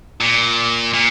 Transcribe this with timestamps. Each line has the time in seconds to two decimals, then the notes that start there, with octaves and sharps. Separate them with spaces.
0.21 A#2
0.94 A#2